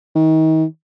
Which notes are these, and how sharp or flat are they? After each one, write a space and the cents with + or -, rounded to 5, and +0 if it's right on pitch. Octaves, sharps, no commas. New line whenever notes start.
D#3 +35